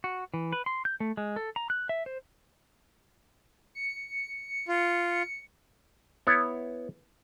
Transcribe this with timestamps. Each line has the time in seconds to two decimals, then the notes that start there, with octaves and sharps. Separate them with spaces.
0.04 F#4
0.34 E3
0.53 B4
0.66 C6
0.85 G6
1.00 A3
1.17 G#3
1.36 A4
1.56 A#5
1.70 F#6
1.89 E5
2.06 C5
3.75 C#7
4.68 F4
6.27 B3 E4 C#5